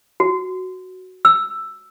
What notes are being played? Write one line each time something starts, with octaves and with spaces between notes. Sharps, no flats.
F#4
E6